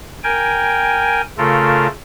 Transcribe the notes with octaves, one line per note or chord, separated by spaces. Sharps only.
A#4 G5 G#5
C#3 A3 F4 A4 A#4